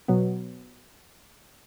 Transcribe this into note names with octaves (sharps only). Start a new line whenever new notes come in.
B2 F#3 B3